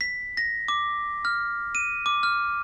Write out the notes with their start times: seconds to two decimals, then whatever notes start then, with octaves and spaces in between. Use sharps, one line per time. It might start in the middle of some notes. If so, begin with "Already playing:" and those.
0.01 B6
0.37 A#6
0.68 D6
1.25 F6
1.75 D#7
2.06 D6
2.23 F6